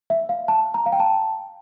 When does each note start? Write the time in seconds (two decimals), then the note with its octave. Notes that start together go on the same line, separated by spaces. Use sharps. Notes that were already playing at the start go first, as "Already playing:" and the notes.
0.10 E5
0.29 F5
0.48 A5
0.74 A#5
0.86 F5
0.92 G5
1.00 A5